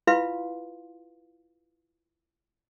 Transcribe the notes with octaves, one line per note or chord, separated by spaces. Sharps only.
E4 F4 B4 F5 C6